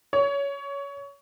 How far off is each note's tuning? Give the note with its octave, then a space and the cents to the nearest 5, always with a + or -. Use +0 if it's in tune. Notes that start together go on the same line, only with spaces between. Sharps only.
C#5 +20